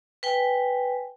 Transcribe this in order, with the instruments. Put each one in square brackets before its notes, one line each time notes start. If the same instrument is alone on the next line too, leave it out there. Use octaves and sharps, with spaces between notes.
[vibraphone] B4 G5 G#5